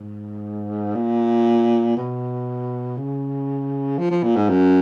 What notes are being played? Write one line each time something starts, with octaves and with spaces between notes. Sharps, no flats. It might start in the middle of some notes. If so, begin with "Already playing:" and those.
Already playing: G#2
A#2
B2
C#3
F3
F3
A#2
G#2
F#2